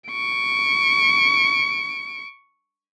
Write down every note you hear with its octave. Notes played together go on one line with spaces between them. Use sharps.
C#6 D7